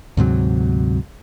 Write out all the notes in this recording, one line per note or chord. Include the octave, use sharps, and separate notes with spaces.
D2 G#2 C3 F#3